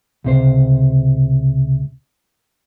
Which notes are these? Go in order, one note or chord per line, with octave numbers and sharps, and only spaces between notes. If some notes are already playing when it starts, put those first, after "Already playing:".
C#2 C3 C5